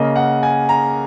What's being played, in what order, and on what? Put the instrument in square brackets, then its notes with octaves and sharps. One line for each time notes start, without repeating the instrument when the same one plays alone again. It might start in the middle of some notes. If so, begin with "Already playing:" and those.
Already playing: [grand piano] C#3 A#3 D#5
F#5
G#5
A#5